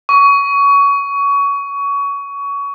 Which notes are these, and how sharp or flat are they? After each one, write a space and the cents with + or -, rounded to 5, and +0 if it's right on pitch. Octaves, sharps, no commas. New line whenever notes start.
C#6 +25